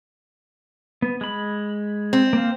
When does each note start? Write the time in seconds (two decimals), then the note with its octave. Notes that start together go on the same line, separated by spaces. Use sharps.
1.02 B3
1.21 G#3 B5
2.13 C4
2.33 A#3 F5